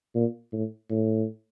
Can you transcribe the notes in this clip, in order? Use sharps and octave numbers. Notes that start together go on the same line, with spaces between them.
A#2
A2
A2